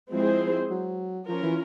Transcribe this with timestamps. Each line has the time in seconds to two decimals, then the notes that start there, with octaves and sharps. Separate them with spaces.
0.11 F3 G#3 C4 E4 G#4 C5
0.70 F#3
1.28 F3 C#4 F4 A#4
1.43 E3